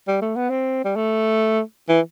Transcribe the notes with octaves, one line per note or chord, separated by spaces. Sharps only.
G3
A3
B3
C4
G3
A3
E3